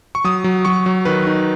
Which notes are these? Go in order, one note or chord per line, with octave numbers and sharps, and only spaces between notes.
C#6
F#3 D#6
F#3
F#3 C#6
F#3
D#3 B4
D#4